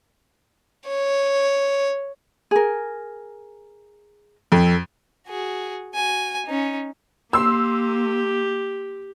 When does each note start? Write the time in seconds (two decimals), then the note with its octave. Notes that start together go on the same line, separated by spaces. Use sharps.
0.88 C#5
2.51 G#4 A#4
4.52 F2 A4
5.28 F#4 G#4
5.95 F#4 G#5
6.46 C#4 D#4
7.33 A#3 G4 C6 E6